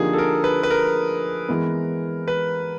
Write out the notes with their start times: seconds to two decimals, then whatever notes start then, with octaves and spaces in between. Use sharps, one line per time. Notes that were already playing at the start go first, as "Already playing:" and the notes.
Already playing: D3 F3 A#3 D#4 G4 G#4
0.13 A4
0.18 A#4
0.44 B4
0.63 B4
0.71 A#4
1.49 E3 G#3 B3
2.28 B4